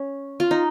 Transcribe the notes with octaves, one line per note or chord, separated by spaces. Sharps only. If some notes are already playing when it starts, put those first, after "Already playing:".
Already playing: C#4
F4
D#4